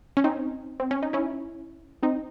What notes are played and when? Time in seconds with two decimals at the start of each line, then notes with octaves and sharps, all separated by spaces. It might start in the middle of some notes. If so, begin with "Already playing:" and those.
0.17 C#4
0.24 C4 D#4
0.80 C4
0.91 C#4
1.03 D#4
1.13 C#4 E4
2.03 C4 D#4